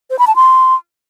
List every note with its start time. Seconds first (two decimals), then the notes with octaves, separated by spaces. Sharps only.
0.10 C5
0.19 B5
0.27 A5
0.36 C6